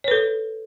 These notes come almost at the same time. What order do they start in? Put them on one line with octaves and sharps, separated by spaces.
C#5 B4 A4